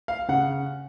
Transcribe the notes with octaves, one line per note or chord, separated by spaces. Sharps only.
F5
C#3 F#5